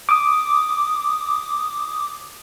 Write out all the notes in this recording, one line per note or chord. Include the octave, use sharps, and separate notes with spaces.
D6 D#6